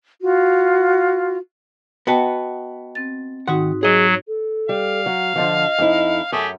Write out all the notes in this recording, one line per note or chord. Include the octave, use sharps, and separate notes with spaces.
F4 F#4
B3 F#4 B4 D#5 G5 A5
C4 A6
G#2 D#3 D#4 F#4 F#5
F#3 G#4 D#5
A4
G3 F5
F#3
D3 F3 F#3 D#5
F2 D#4 E4
F#2 A3 G4 G#4